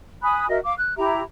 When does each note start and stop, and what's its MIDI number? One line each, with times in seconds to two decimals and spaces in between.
0.22 0.48 80
0.22 0.48 83
0.22 0.48 87
0.22 0.48 90
0.49 0.59 66
0.49 0.59 70
0.49 0.59 75
0.49 0.59 76
0.64 0.74 77
0.64 0.74 86
0.78 0.96 90
0.98 1.21 64
0.98 1.21 67
0.98 1.21 76
0.98 1.21 82